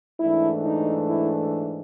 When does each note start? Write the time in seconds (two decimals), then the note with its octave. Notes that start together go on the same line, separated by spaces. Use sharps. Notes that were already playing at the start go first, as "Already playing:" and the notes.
0.19 G#2 E3 A3 D4 E4
0.64 D#4
1.08 E4